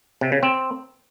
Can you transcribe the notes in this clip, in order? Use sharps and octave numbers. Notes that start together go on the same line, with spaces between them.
C3
C#3
C4